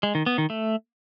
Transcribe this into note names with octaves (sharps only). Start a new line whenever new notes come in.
G#3
D#3
B3
D#3
A3